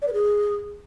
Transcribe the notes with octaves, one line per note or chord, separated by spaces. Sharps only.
D5
B4
G#4